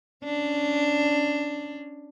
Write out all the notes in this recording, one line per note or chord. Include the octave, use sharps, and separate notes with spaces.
C#4 D4